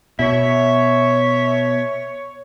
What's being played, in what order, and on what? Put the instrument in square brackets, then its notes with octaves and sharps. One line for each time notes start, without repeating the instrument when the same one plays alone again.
[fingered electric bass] B2 [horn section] C#5 [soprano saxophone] E5